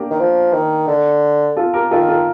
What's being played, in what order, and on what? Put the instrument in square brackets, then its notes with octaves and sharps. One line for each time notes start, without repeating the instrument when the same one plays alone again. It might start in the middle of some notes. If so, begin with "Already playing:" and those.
Already playing: [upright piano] A#3 D4 G4 A#4
[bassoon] D#3
F3
D#3
D3
[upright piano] F4 A4
G4 A#4
[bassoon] D#3 [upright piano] F4 A4
[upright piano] F4 A4